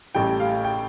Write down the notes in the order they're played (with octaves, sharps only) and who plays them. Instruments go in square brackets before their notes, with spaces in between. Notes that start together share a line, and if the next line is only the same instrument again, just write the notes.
[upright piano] A1 A2 G3 G5
F5
G5